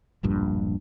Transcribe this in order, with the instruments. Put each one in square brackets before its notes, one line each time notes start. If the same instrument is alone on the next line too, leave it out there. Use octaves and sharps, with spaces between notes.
[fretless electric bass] E1 A#1 G2 A#2